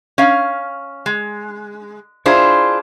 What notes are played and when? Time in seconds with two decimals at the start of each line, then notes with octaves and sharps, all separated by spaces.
0.18 C#4 F5
1.06 G#3
2.26 D4 E4 F4 G#4 C5